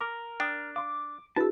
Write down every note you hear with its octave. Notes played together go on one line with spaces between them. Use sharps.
A#4 D6 F6
D4 G5 D#6 F6
F5 C6 D6
D4 E4 F#4 G#4 B4 A5 E6